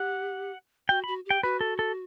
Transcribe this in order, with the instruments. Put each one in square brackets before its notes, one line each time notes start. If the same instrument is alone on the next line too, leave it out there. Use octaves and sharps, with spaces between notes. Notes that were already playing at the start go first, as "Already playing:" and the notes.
Already playing: [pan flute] G4 [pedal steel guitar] F#5
[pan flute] F#4 [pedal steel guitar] G5
[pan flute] F#4 [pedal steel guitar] B5
[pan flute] G4 [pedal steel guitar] G5
[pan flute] F#4 [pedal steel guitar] B4
[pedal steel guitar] A4
A4